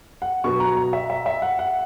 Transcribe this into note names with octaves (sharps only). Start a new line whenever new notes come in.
F#5
B2 F#3 B3 C#6
A#5
A#5
E5
E5
E5
F#5
F#5